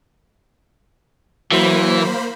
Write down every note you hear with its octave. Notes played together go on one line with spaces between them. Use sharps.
E3 F#3 A#3 C5 B5